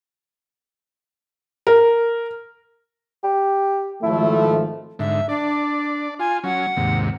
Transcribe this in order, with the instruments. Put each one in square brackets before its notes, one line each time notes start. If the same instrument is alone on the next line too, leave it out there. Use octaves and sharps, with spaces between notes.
[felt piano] A#4
[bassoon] G4
[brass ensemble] G#1 F3 A3 [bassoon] E4
[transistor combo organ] G#2 D3 [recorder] E5
[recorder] D4 [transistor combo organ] D5
[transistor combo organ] F4 [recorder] G#5
[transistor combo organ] F#3 C#4 [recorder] F#5
[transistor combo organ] D#2 G#2 C3